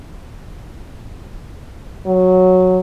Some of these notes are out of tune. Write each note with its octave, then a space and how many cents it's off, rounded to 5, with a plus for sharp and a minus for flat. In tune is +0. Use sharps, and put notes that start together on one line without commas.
F#3 -5